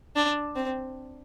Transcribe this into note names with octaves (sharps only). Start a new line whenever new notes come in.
D4
C4